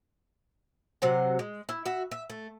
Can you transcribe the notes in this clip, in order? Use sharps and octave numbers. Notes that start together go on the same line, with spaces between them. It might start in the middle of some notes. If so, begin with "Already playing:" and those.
C3 F#3 C5 F#5
G#3
E4
F#4 E5
E5
A3